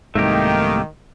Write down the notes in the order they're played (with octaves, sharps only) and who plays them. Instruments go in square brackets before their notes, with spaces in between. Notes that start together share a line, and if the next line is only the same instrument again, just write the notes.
[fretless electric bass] C2 G#2 [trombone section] D#3 [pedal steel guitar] A3 A#3 G4